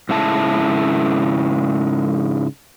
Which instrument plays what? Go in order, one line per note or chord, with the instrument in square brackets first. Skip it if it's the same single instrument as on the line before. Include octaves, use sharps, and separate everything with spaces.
[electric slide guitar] G#2 C#3 E4 A5